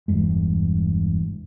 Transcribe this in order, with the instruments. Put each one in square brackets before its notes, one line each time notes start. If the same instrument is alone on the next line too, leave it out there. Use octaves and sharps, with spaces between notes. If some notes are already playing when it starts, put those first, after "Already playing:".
[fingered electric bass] E1 E2 G2 G#3